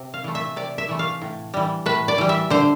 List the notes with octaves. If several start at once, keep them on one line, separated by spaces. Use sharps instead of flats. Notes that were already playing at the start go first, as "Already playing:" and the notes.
Already playing: C3
F5
E3 A3
E5
C3 D5
E5
E3 A3
F5
A2
E3 G3
A2 B4
D5
E3 G3
E5
D3 C5